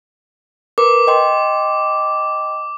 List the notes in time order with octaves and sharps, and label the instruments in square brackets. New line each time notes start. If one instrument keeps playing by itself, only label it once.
[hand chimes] A#4 B4 [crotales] D6
[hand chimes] D#5 G5 C6